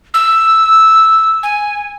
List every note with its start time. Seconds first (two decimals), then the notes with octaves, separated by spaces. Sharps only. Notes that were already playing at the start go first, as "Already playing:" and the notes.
0.14 E6
1.43 G#5